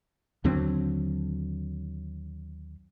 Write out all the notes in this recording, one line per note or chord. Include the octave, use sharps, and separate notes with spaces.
D#2 D3 F#3 C4